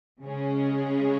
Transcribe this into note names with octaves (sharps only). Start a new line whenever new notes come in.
C#3 G#3 C#4 G#4